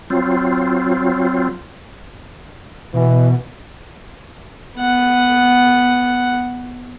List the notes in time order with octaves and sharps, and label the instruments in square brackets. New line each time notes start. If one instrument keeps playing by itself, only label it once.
[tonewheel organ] F#3 C4 F4
[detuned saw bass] B2 [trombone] E3
[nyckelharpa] B3 F#5